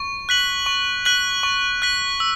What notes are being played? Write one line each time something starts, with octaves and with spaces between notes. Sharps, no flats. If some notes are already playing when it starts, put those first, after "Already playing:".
Already playing: C#6
F#6 B6 F#7
C#6
F#6 B6 F#7
C#6
F#6 B6 F#7
E6